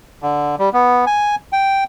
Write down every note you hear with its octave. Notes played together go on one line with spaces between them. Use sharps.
D3
G3
B3
G#5
G5